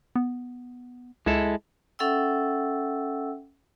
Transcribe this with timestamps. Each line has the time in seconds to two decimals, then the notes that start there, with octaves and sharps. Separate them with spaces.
0.16 B3
1.26 C#2 G#3 E4 A4
1.99 C#4 A4 E5 F#5 G5 E6